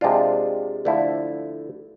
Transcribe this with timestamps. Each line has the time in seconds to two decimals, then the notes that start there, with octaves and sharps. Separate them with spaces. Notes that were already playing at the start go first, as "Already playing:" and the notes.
0.01 C3 G#3 D4 F4
0.85 D3 F3 A3 E4